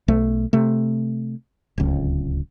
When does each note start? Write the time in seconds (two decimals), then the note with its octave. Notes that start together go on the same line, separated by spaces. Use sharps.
0.08 B1 A3
0.53 C3 A3
1.78 D1 C#2